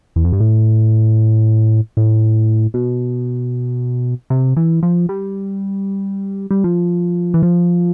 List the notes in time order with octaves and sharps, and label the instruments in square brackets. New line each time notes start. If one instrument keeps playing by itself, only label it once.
[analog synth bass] E2
F2
G2
A2
A2
B2
C3
E3
F3
G3
G3
F3
E3
F3